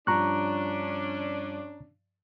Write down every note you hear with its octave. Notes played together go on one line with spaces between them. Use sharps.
G2 F3 C#4 D4 A5 A#5 C#6 F#6